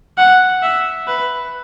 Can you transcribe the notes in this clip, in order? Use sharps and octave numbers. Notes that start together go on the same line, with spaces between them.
F#5
E5
B4